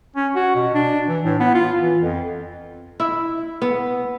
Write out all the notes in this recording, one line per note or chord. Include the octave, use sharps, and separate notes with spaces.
C#4
F#4
B2
D4
E3
A2
B3
F4
E3
F2
E4
B3